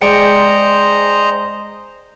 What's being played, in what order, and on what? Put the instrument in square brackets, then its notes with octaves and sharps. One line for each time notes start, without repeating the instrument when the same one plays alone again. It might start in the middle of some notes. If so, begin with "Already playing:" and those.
[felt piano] G#3 [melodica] C5 D#5 A#5 [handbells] D5 G5 C#7